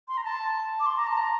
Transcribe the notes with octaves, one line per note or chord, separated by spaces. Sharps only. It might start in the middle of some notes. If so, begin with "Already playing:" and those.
C6
A#5
A5
D6
C6
A#5
A5
A#5